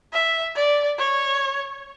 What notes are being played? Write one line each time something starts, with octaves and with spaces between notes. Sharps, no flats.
E5
D5
C#5